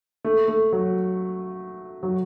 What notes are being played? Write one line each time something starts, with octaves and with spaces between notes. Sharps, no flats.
A3
A3
F#3
F#3